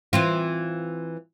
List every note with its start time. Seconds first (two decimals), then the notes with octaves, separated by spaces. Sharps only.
0.13 E3 C4 F4